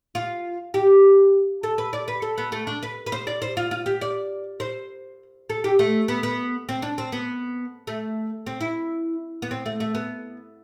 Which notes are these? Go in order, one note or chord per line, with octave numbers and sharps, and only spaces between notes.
F4
G4
A4
B4
D5
B4
A4
B3
A3
D4
B4
B4
C5
D5
C5
F4
F4
G4
D5
C5
A4
G4
A3
B3
B3
C4
D4
C4
B3
A3
C4
E4
B3
C4
A3
A3
B3